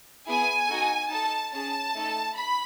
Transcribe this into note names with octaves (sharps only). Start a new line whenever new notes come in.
B3 E4 G#4 G#5
D#4 F#4 A4
D#4 A4 A5
C#4 G#4 A5
A3 D#4 A4
B5